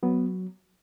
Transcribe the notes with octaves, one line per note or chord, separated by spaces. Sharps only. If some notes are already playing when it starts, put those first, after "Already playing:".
F#3 B3